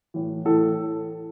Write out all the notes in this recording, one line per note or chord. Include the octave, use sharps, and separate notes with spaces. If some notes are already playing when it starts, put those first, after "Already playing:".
A2 E3
A2 E3 A4